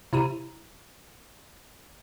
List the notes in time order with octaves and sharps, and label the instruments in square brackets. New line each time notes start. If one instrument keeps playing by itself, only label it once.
[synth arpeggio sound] C3 E4 A#5 D#7